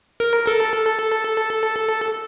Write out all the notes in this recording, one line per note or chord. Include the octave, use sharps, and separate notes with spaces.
A#4
A4